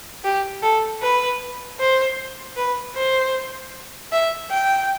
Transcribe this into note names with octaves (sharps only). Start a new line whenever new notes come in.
G4
A4
B4
C5
B4
C5
E5
G5